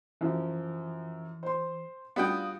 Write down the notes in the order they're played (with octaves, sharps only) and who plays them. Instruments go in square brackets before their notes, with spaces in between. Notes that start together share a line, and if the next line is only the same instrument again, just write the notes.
[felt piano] F#2 F3 [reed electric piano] E3
[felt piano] C5 C6
[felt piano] G3 D4 F4 [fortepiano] B3 F#4 G5 [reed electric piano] F5 D#6